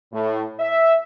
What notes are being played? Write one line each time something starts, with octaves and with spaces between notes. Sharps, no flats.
A2
E5